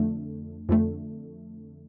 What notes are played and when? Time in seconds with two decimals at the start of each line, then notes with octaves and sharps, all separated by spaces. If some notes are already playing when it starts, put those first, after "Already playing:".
Already playing: F2 D3 A3
0.69 F2 D3 A3